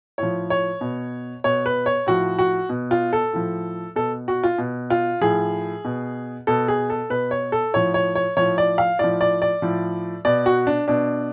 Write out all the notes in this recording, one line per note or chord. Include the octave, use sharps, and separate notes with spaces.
A2 F3 C#5
C#5
B2
B2 C#5
B4
C#5
A2 F3 F#4
F#4
B2
F4
A4
A2 F3
B2 A4
F#4
F4
B2
F4
A2 F3 G#4
B2
B2 A4
G#4
A4
B2 B4
C#5
A4
A2 F3 C#5
C#5
C#5
A2 F3 C#5
D5
F5
A2 F3 D5
D5
D5
A2 F3
B2 D5
F#4
D4
B2 D4